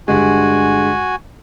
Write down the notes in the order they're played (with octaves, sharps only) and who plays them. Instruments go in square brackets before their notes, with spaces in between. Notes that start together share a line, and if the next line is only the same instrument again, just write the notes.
[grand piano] G2 D3 G#3 [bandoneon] F#4 G#5